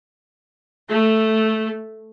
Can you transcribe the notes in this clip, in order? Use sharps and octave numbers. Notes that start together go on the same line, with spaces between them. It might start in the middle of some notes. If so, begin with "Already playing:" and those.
A3